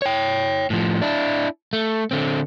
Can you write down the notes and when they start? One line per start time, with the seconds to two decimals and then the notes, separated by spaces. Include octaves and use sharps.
0.02 C#5 G5
0.70 A2 F3
1.02 D4 E4
1.73 A3
2.11 D3 C4